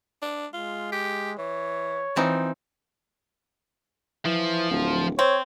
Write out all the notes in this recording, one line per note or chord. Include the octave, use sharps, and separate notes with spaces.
D4
G#3 F4
G4
E3 C#5
E3 F3 C4 D#4
E3 F3
D1
C4 C#5